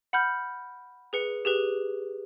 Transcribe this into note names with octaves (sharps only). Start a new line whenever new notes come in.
F#5 B5 F6 G6
G#4 B4 C#7
G4 G#4 B4